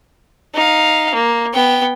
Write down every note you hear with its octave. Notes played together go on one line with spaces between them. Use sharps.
D#4 F5
A#3
B3 G5